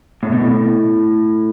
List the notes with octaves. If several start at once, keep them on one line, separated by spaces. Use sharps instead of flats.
A2
B2
A2